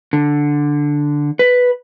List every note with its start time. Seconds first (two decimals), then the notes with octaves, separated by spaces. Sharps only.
0.13 D3
1.39 B4